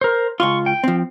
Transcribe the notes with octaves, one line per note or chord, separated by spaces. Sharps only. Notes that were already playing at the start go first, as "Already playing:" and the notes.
A#4 C5
C#2 F4 C6 C#6
G5
F3 C4